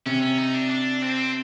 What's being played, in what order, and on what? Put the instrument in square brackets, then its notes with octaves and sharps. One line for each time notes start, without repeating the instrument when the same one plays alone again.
[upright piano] C3 [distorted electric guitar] C#4
[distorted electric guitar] C#4
D#4
D4
D4
C4